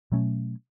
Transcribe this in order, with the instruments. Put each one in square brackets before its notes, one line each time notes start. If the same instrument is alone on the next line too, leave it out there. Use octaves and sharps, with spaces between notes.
[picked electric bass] B2 F#3 A3 C#4